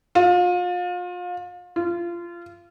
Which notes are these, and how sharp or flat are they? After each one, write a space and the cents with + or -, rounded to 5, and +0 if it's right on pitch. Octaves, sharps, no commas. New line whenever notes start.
F4 +35
F4 -20